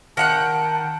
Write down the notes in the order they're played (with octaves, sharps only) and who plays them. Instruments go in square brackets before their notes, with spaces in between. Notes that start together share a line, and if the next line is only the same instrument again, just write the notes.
[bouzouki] D#3 F#5 G5 [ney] A5